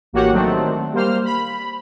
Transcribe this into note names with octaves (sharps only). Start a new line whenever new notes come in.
A1 A#3 F#4 G4 C#5 F#5
D#3 F#3 A3 C4 D4
G3 A#3 C5 F6
B5